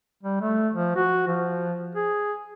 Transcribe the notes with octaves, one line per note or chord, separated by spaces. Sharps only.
G3
A3
F3
F#4
F3
G#4